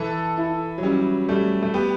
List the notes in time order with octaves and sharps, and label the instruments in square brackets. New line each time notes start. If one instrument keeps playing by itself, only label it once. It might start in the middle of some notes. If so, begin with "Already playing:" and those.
Already playing: [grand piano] E3 [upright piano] A4
[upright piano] E4
[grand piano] F#3
[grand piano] G3 [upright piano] C#4
[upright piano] G3 [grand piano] A3
[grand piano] A3
[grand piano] B3 [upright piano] G4